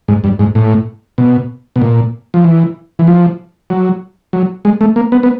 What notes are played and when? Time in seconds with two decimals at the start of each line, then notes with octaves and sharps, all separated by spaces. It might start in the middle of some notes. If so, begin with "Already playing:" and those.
0.08 G#2
0.24 G2
0.39 G#2
0.55 A2
1.18 B2
1.76 B2
1.82 A#2
2.34 F3
2.44 E3
2.99 E3
3.07 F3
3.70 F#3
4.33 F#3
4.65 G#3
4.81 A3
4.96 A#3
5.12 B3
5.23 B3